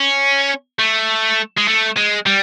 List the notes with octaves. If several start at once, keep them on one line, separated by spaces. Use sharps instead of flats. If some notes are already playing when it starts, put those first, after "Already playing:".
Already playing: C#4
A3
G#3
A3
G#3
G3